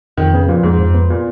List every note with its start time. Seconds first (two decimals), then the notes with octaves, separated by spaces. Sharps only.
0.17 F2 D#3
0.33 C#3 B3
0.48 A#2 F3
0.63 F2 G#2
0.79 F2
0.94 B3
1.10 A#2